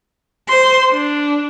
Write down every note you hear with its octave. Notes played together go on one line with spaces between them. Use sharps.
C5 C6
D4